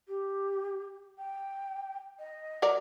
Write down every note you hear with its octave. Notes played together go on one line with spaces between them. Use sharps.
G4
G5
D#5
F#3 A#4 D5